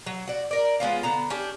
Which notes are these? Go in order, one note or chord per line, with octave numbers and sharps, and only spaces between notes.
F#3
F#4 D5
A#4 D5
G#3 B3 C#4 F4
D3 B3 A#5
C#4 D4 G4